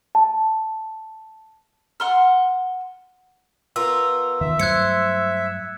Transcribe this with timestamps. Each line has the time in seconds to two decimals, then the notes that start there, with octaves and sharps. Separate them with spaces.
0.15 A5
2.00 F#5 C6 F6
3.76 B3 F4 A#4 E6
4.41 E2 D#3 E5
4.59 G2 F#3 A3 C5 F#6 G#6 C#7